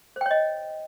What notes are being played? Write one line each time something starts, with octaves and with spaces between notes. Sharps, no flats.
C5 C#5 D#5 G5